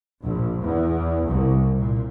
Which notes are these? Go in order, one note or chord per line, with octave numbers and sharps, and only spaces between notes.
A#1
E2
C2
A#2